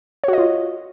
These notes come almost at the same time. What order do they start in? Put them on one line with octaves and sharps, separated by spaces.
C#5 F#4 D#5 F4